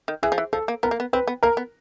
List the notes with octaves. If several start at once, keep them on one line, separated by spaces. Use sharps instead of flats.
D#3
E3 G#4
F3
E3
F3 A4
A#3
B3 A#4
A#3
B3
C4 B4
B3
A#3 A#4
B3